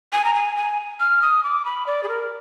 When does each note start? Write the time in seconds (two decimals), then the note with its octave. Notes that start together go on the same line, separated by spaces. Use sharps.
0.13 G#5
0.25 A#5
0.34 G#5
0.56 G#5
1.00 F6
1.22 D#6
1.44 D6
1.65 B5
1.87 D5
2.03 G#4
2.09 A#4